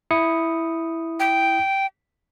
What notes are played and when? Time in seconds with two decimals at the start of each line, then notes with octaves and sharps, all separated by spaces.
0.11 E4 D#6 C#7
1.20 G5